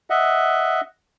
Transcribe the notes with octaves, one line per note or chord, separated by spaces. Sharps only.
D#5 E5 F#5